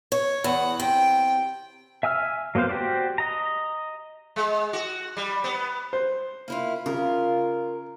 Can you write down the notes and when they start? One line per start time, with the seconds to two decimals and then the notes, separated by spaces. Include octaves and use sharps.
0.12 C#5
0.44 E2 F#5
0.80 C3 G5
2.03 E5 G#5 E6 F6
2.55 F#3 A#3 B3 C5 F5
2.69 F#4 G4 C5 D5
3.18 D#5 A#5
4.36 G#3
4.73 F#4
5.17 G3
5.44 B3
5.93 C5
6.48 A#3 E4 F4
6.86 C#3 F4 A#4